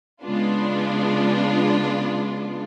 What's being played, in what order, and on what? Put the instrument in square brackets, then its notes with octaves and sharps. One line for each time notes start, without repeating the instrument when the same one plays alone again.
[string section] C#3 G#3 B3 D4 F4